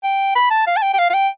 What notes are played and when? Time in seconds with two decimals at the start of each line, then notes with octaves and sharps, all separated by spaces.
0.03 G5
0.35 B5
0.50 A5
0.67 F5
0.77 A5
0.82 G5
0.94 G5
0.99 F5
1.10 F5
1.14 G5